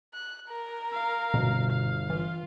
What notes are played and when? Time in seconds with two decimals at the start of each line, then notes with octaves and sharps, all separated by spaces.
0.13 F#6
0.48 A#4
0.92 F5
1.34 G1 B2
1.70 F5
2.10 E3 F4